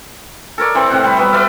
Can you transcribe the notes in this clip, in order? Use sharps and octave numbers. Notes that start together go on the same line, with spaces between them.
A4 A#4 C#5 D5
E3 C4
A2 C3 C4 F#5
G3 B5
F#3 G3 B3 B4
B4 D5 E5 F5